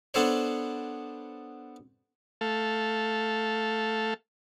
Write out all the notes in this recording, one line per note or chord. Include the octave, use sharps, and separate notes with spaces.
B3 D4 A4 C5 C#5
A3 A4 F5